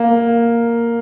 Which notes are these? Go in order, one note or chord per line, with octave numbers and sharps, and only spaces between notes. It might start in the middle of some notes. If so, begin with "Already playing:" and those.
Already playing: A#3